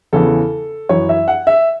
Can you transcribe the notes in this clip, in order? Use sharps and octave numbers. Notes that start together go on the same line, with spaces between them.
E2 C#3 E3 A4
F#2 E3 C#5
E5
F#5
E5